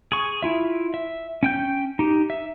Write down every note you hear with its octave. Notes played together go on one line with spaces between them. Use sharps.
G#4 C#6
E4 F4 E5
E5
C#4 G5 G6
D#4 G4
E5